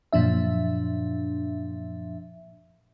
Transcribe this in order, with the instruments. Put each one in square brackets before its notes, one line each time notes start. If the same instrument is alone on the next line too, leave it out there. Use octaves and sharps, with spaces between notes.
[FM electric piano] F#2 A#2 F3 D4 E5